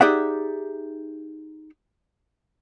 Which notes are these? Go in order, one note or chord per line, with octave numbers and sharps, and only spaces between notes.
D#4 G4 G#4 D5 E5 F#5